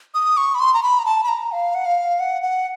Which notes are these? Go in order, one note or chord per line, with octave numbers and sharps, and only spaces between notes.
D#6
C#6
B5
C6
A#5
B5
A#5
A5
B5
A#5
F5
F#5
F5
F#5
F#5